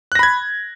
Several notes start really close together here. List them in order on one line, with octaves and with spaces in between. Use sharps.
F#6 A#6 B5 G#6